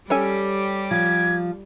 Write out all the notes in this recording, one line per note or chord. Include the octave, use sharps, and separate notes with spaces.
G3 C#4 G4 A4 G#5
F3 G#6